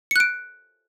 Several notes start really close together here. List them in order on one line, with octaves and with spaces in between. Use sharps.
C#7 F#6 D7